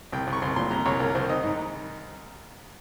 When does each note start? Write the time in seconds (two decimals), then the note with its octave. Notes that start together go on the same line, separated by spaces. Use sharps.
0.12 C2 G5
0.27 C2
0.33 C#6
0.42 C2 C6
0.56 A#2 C6
0.71 C2 A#5
0.86 C2 C#5
1.00 C2 A#4
1.15 C2 C5
1.29 D#3 D#5
1.43 G#2